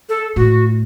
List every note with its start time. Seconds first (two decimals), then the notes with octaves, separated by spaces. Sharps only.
0.09 A4
0.36 A2 F#4